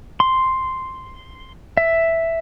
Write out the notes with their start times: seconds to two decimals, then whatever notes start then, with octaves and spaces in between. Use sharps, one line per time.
0.20 C6
1.77 E5